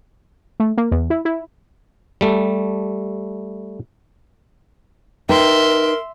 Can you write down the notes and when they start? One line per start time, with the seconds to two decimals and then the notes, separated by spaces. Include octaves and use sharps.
0.60 A3
0.77 A#3
0.91 E2
1.10 E4
1.25 E4
2.21 G3 A3
5.29 D#4 A#4 B4 E5 G5 C6